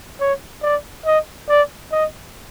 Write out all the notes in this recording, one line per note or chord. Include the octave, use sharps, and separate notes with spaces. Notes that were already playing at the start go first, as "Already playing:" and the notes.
C#5
D5
D#5
D5
D#5